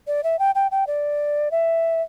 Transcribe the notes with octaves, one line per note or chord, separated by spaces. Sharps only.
D5
E5
G5
G5
G5
D5
E5